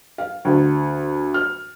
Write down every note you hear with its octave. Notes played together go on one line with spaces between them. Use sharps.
F5
D2
F6